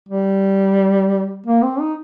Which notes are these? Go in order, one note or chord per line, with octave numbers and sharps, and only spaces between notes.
G3
A#3
C4
D#4